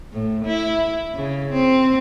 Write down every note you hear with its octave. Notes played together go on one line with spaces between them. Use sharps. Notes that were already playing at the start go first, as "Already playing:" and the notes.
A2
E4
C#3
C4